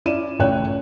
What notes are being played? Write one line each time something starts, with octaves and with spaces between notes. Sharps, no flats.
C#4 E4 D5 D#7 E7
A1 C#3 A3 C#5 G5 F#6